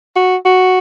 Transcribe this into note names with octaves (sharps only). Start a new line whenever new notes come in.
F#4
F#4